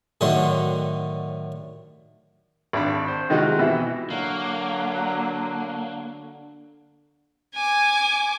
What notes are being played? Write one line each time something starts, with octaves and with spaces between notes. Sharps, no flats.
A2 D3 D#3 F#3 A3 C6
G#1 D4 B5
C5
C3 D#3 G#3 D#4 F4 F#4
B2 E3 E4
D3 F#3 A#3
G#5 D6